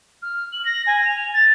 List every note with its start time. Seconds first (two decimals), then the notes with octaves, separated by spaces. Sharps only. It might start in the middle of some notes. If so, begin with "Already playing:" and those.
0.22 F6
0.52 F#7
0.65 A#6
0.86 G#5
1.05 F7
1.33 A6